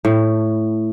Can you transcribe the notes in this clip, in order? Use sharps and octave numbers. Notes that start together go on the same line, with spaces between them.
A2